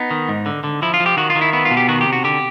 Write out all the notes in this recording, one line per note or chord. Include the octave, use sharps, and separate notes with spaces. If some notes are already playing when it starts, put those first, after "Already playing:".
Already playing: B3 D#4
D#3
G#2
D3
D3
F3 E4
F4
F3
G4
D#3 F#4
F4
D#3
E4
B3 E4
F4
B2
G4
D#3 F#4
G4
C3
F#4
D3 G4